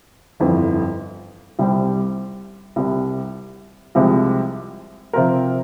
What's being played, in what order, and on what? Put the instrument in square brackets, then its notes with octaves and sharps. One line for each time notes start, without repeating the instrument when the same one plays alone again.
[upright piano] G1 F2 E3
C2 C3 G3 C4
C2 C3 G3
C2 C3 F3 G#3
C3 F3 C4 F4 A#4